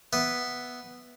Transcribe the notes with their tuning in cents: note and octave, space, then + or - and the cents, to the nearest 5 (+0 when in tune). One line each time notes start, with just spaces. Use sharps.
B3 +0 E5 +0